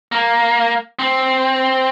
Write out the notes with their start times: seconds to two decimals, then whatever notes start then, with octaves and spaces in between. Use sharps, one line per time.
0.12 A#3
0.99 C4